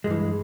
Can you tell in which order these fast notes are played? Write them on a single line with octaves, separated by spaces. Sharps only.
G#3 G2 E3